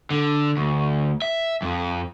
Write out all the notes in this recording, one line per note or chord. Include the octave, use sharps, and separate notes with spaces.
D3
D2
E5
F2